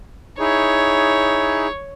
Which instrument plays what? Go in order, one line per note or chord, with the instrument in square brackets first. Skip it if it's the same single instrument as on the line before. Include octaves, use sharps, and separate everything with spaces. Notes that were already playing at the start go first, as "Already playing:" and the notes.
[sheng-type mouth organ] D#4 E4 G#4 [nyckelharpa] C#5